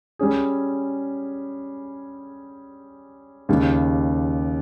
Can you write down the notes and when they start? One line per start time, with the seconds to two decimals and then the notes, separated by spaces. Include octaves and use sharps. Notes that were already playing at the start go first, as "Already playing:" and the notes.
0.19 G3 C#4 G#4
3.49 D#2 C#3 G3